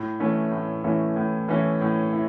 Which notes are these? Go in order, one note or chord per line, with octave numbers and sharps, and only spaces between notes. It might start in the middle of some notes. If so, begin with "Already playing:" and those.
Already playing: A2
E3 A3 C#4 E4
A2
E3 A3 C#4 E4
A2
E3 A3 C#4 E4
A2
E4